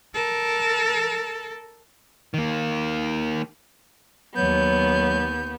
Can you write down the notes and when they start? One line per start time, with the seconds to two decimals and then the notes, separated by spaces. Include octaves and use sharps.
0.14 A4 A#4
2.34 D#3 A#3
4.36 D#2 F#3 B3 G6